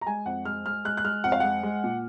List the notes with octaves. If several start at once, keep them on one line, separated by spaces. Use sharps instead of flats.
A#5
G#3 G#5
F2 F#5
G#3 F6
G#3 F6
G#3 F#6
F#6
G#3 F6
F2 F#5
F5
G#3 F#5
G#3
A#2